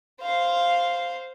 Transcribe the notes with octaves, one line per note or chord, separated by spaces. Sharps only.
C5 F5